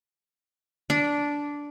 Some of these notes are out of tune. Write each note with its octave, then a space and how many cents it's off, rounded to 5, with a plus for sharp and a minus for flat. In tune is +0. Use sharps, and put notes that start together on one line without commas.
D4 -10